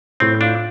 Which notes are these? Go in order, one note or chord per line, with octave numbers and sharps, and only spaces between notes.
A2 C4
D4 F4